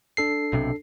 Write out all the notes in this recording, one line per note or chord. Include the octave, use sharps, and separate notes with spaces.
D4 A4 C7
B1 C3